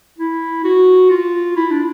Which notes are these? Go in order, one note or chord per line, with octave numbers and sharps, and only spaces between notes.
E4
F#4
F4
E4
D4